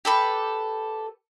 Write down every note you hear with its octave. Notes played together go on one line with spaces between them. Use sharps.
G4 A4 B4